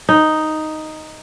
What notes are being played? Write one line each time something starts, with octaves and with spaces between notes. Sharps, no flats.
D#4